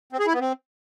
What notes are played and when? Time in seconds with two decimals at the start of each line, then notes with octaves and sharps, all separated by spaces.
0.13 C4
0.19 G#4
0.26 E4
0.33 B3
0.40 C4